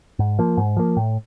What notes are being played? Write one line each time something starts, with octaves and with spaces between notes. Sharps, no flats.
G#2
F3 A#3
G#2
F3 A#3
A2